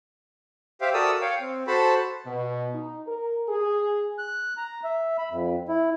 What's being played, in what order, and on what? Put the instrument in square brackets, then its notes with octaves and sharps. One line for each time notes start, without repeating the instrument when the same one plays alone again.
[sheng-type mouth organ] G4 C5 E5 F5 G5
F#4 A4 A#4 D5 D#6 E6
C#5 F5 G5
C4
F#4 A4 C5 A5 B5
[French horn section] B2
D#4
A#4
G#4
[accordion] F#6
A#5
E5
B5
F2
E4